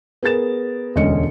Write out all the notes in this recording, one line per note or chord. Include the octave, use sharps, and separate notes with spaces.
B3 G#4 A#4 A6 E7
E1 D2 G#3 C#4 D#5 C#7